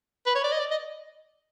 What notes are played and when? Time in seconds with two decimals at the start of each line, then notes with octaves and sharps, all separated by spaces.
0.27 B4
0.35 C#5
0.44 D5
0.52 D#5
0.60 D5
0.71 D#5